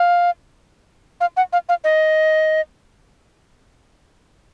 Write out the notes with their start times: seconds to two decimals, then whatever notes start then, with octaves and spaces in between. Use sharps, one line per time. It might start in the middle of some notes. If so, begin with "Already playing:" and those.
Already playing: F5
1.20 F5
1.37 F#5
1.53 F5
1.69 F5
1.84 D#5